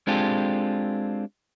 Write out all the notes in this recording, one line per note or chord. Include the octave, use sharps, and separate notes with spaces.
G#3 C4 D4 F4 G4 A4